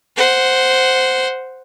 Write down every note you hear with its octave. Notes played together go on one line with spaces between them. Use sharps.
C5 F#5